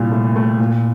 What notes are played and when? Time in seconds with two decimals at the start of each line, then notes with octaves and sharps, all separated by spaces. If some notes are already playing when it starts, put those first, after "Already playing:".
Already playing: C2 A#2
0.12 A3
0.36 A3
0.59 A#2